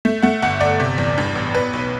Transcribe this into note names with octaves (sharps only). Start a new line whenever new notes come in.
A3
A3 F#5
G1 F#5
G1 D5
C3
E2
G2
A1
B3 B4
B1